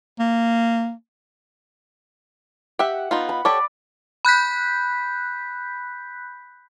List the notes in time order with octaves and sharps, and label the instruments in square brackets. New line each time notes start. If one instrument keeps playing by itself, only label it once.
[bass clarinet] A#3
[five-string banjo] G4 E5 [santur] F#5
[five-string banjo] B3 D#4 F4
[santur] B5
[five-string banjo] G4 A4 C#5 [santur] D5
[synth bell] B5 F#6 G6 B6